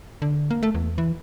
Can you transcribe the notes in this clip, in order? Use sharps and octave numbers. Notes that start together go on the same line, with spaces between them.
D3
A#3
A3
E2
E3